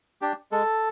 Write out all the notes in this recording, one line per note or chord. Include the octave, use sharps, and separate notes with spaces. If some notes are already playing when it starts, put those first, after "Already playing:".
D4 G4
G#3 A4